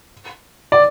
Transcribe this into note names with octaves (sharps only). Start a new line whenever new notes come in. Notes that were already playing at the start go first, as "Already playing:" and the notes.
D5